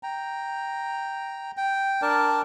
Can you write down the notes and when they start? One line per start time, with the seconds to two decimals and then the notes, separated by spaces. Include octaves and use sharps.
0.03 G5 A#5
1.57 G5
2.02 D4 A#4 D5 A5